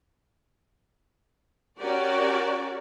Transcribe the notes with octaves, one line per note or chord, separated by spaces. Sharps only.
C#4 F#4 G4 A#4 D5